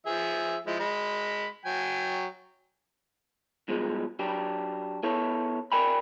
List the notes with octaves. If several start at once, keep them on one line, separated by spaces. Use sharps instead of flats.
F3 G#4 E5
F3 G#3 E4
G#3 B5
F#3 G5 G#5
G2 B2 F3 G#3
F#3 D4 G4
B3 E4 A4 C#5
A#4 D5 G5 G#5 B5